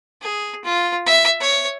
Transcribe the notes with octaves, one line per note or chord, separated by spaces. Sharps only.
G#4
F4
E5
C#5